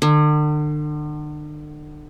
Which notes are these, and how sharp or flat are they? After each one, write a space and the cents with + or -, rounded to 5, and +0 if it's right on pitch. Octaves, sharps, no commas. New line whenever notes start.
D3 +40